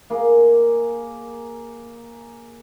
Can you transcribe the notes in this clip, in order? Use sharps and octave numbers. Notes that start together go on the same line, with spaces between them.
A#3 G#4